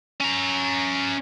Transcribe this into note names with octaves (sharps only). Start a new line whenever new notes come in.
C#4 A#5